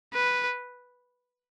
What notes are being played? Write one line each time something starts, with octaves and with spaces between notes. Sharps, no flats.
B4